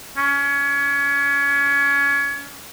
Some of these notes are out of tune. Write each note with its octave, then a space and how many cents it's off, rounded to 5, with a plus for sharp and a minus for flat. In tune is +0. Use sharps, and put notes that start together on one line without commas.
C#4 +25